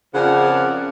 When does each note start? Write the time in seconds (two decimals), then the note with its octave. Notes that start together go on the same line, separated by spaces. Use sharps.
0.14 F2 C#3 F3 A#4 D5 F#5